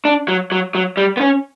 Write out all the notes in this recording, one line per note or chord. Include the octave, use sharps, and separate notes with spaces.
D4
F#3
F#3
F#3
G3
B3
C#4